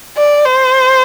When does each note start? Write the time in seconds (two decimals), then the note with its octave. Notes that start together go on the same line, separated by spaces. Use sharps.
0.17 D5
0.46 C5